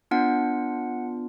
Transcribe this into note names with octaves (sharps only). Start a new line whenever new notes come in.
B3 D4 F4 F#5